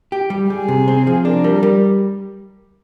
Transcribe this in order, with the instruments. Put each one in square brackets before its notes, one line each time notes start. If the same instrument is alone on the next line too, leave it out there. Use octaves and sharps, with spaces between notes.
[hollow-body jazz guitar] G4
G3
[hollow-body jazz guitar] G3 [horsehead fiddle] G#4
[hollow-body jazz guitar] C3
C4
F3
[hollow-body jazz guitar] D4 [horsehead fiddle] A#4
[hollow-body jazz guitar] G3
G3